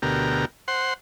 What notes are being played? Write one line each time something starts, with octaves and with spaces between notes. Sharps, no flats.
D2 B2 G4 A#4
C5 F#5 C6